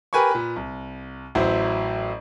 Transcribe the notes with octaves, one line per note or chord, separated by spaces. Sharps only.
G4 A#4 B4 G#5 B5 C#6
A#2 B4
C2
A1 F#3 E4 C5